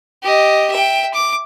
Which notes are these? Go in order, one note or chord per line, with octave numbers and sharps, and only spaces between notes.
G4 D#5
E5 G5
D6